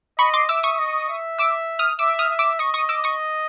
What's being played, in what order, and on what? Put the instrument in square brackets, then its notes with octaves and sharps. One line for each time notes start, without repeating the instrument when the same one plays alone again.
[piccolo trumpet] D#5 [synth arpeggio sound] B5 C#6
[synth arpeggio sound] C6 D6
[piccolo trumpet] E5 [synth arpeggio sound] D6 E6
[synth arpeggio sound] C#6 D#6
[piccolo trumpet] D#5
E5
[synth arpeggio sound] D6 E6
D#6 F6
[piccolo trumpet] E5 [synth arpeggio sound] D6 E6
[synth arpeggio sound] D#6 F6
[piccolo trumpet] E5
[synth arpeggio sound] D6 E6
[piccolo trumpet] D#5 [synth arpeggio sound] C#6 D#6
[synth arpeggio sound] C#6 D#6
D6 E6
C#6 D#6